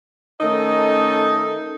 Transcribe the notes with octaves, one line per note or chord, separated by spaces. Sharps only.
D#3 A3 C#4 D#4 A4 D#5